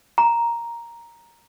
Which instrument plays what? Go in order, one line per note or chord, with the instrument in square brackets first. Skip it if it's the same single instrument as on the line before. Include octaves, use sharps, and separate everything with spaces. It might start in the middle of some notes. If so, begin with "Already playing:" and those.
[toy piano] A#5